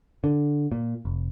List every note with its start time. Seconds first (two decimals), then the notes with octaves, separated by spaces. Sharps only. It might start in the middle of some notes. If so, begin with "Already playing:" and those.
0.24 D3
0.72 A#2
1.05 F1